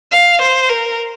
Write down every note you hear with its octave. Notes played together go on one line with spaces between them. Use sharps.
F5
C5
A#4